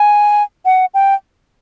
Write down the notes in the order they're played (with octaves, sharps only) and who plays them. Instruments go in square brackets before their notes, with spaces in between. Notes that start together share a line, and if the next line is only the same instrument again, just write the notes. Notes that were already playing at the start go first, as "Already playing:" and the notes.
Already playing: [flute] G#5
F#5
G5